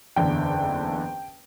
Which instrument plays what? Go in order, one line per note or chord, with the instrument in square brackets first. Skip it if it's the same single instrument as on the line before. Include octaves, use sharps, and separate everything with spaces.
[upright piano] F#1 E2 D3 G5